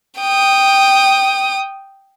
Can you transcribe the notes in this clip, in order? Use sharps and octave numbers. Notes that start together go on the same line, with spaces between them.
G5 D#6